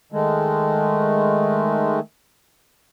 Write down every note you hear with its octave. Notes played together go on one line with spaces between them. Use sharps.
D#3 G#3 A3